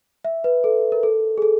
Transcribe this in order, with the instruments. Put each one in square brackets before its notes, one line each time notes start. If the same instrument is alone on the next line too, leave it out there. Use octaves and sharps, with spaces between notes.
[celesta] E5
B4
A4
A#4
A4
G#4
A4